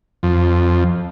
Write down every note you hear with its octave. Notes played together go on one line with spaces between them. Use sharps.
F2